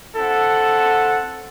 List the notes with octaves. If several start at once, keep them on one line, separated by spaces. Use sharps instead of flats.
C4 E4 A4 F#5